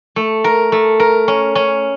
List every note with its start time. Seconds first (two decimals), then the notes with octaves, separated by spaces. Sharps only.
0.16 A3
0.44 A#4
0.72 A3
1.00 A#4
1.28 C#4
1.55 C#4